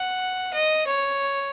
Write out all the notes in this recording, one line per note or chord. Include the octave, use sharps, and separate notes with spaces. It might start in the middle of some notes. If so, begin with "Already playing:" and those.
Already playing: F#5
D#5
C#5